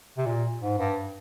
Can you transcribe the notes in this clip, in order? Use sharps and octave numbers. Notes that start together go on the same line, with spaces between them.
C3
A#2
G#2
G2